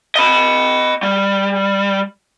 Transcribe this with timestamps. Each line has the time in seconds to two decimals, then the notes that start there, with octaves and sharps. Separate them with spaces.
0.16 D#5 B5
1.03 G3